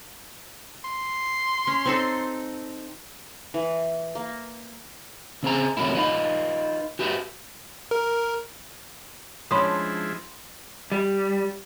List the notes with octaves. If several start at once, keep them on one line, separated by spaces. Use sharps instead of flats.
C6
C#4
C4 D#4 A4
E3
A#3
C#3 C4 G#4 A#5
F#2 C3 D#3 F#3 A3 E4
D#4 F4 B4
F#4 G4 B4 E5
A#4
F3 G#3 C#4 D4 E4 B5 C6 D#6
G3